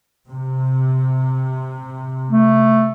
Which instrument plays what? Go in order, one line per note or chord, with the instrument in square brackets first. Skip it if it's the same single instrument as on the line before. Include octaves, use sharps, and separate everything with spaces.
[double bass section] C3
[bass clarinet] A3